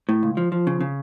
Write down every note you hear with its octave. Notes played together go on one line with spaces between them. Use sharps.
A2
C#2
F3
F3
C#3
C#3